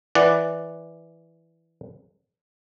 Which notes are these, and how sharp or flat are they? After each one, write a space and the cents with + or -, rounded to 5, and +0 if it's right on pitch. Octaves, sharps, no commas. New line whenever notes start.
E3 +0 D5 +0 F#5 +0